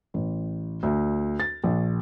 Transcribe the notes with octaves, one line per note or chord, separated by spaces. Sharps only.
A1
D2
A6
A#1